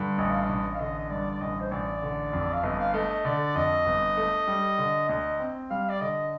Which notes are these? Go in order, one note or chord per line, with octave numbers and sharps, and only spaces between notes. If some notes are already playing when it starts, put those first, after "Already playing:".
Already playing: G2 D3
A1 D#5
F5
D#5
A1
F5
D3 D#5
D#5
G2 D5
D5
A1 D#5
C5
A1 D5
D3
F2
F5
G1 D#5
F5
A3 D#5
D#5
D3 D5
F2 D#5
G1
A3
G3
D3
D2 D#5
C4
G3 F5
D5
D3 D#5